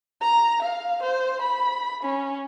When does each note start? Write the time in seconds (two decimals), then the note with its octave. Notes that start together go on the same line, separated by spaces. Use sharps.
0.21 A#5
0.62 F5
1.02 C5
1.42 B5
2.03 C#4